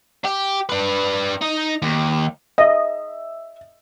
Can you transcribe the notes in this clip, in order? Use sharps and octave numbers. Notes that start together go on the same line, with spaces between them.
G4
D4 B4
D#4
D#2
D#5 E5